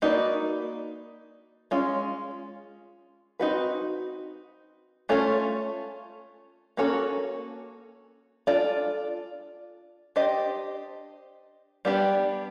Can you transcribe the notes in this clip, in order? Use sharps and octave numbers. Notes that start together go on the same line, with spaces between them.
A#3 D#4 F#4 B4 D5
G#3 C#4 F4
C4 D#4 F#4 B4
A3 C#4 F4 A4 C#5
A#3 C#4 F#4 A4 C#5
D4 F4 A4 D5
D4 G4 C5 D#5
G3 B3 D4 G4